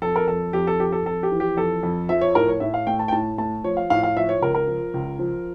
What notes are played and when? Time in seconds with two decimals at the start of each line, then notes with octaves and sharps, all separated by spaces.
0.02 F2 A4
0.16 A#4
0.28 F2 A4
0.53 F2 G4
0.67 A4
0.80 F2 G4
0.92 A4
1.06 F2 A4
1.23 G4
1.32 E3
1.40 G4
1.57 F2 A4
1.83 F2
2.09 F3 E5
2.21 C#5
2.35 A2 A#4
2.48 C#5
2.60 A2 E5
2.74 F5
2.87 A3 G5
2.99 A5
3.08 G5
3.12 A2 A5
3.38 A3 A5
3.64 F3 C#5
3.77 F5
3.90 A2 F5
4.03 F5
4.16 F3 E5
4.29 C#5
4.42 C#2 A#4
4.55 A#4
4.67 F3
4.94 C#2
5.19 F3